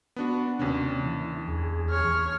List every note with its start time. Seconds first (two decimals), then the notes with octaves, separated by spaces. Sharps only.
0.16 B3 D4 F#4
0.59 D#2 C3 C#4 D4
1.03 E3
1.48 E2 G#4
1.90 C#5 F6